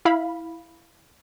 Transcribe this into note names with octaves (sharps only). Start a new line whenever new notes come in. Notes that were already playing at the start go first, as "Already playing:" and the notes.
E4 F5 B5